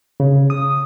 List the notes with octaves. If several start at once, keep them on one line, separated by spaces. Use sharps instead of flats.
C#3
D#6